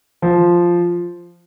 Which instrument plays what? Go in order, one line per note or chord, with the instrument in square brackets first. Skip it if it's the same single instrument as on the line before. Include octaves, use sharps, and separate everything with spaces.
[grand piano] F3